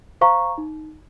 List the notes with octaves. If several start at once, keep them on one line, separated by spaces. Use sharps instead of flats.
C5 F5 A#5 C#6
D#4